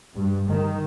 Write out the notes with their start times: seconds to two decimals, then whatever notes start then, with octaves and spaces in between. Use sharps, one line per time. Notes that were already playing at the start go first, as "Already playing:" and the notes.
0.15 G2
0.49 D#3